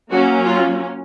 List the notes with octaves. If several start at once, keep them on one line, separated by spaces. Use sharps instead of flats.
F#3 A#3 C#4 F#4
F4